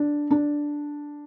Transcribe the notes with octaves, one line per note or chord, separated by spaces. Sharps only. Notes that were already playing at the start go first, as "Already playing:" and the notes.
Already playing: D4
D4